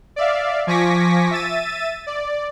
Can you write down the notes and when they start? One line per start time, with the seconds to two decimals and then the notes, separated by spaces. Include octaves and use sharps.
0.16 D5 E5 F5
0.67 F3 G#5 C#6 D6 A#6 B6
1.31 E5 E6 A6 D#7
2.07 D5